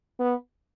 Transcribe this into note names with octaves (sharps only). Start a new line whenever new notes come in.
B3